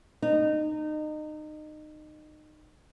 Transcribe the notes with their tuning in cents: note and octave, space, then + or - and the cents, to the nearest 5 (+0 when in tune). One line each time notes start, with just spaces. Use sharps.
D#4 -25